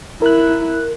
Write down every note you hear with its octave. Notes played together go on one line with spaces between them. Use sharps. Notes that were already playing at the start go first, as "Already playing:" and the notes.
E4 A#4 F#6